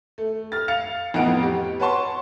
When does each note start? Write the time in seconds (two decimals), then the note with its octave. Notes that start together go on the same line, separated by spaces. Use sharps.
0.18 A3
0.52 F6 A6
0.68 F5 A6 C#7 F7
1.14 A1 F2 B3 D#5 F#5 D7
1.42 G4
1.80 B4 C#5 F#5 A5 C6 C#6